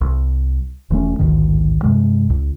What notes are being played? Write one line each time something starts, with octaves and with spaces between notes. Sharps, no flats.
C2
E1 E3 A3 C#4
A1 D2 G#2 D#3
G2 C3 G#3
C#2